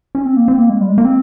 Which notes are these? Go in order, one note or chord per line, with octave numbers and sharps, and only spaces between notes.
C#4
C4
A#3
C4
A#3
G#3
G3
G#3
A#3
C4